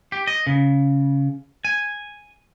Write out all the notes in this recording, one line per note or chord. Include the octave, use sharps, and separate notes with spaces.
G4
D#5
C#3
G#5